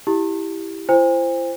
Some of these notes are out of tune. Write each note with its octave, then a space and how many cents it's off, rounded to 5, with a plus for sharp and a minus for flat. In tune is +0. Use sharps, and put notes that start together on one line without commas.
E4 +0 G4 +0
E4 +45 C5 +0 G#5 -45